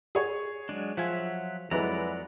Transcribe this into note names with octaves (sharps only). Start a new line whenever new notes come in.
G#4 C#5
F#3 G#3 D4
F3 F#3 F4 E5 F#5 G#5
F2 F#3 G#3 E4 B4 D5 F#5 A#5